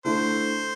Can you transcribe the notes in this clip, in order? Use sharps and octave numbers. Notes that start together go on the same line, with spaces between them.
D3 A3 E4 C5